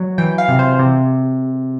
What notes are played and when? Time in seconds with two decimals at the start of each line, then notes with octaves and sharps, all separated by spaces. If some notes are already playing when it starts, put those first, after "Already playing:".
Already playing: F#3
0.18 E3 G5
0.38 F5
0.48 C3
0.59 C5
0.79 C3